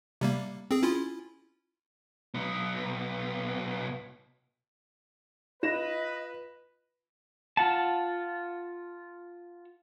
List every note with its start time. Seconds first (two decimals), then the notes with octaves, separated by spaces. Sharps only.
0.21 C3 G3 A#3
0.71 C4 G#4
0.83 C#4 E4 F4
2.34 B1 B3
5.63 F4 B4 D#5 A#6 E7
7.57 F4 F#5 A5